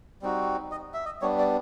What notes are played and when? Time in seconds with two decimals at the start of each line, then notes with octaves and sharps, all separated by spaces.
0.22 G3 C4 D#4 F#4
0.71 D#5
0.94 E5
1.06 D#5
1.22 G3 B3 D4 C#5
1.38 D5